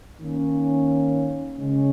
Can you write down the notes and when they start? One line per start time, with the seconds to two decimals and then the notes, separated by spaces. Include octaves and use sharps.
0.21 D#3 A#3 C#4
1.57 C#3 G#3 C#4